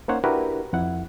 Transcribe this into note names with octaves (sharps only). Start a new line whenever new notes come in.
A#3 C#4 D#4 C5 C#5 F#5
D4 E4 F#4 G4 A#4 B4
F2 E4 F#5